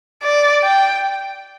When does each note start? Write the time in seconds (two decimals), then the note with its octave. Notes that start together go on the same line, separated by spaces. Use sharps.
0.23 D5
0.64 G5